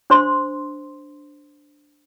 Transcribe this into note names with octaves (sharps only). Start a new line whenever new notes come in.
D4 C5 C6